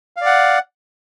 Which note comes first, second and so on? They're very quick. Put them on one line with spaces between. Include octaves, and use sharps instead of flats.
F5 D5 F#5